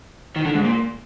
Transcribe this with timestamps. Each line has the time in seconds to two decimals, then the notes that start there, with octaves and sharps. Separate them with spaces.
0.36 D#3
0.46 D3
0.55 G#2
0.65 A#2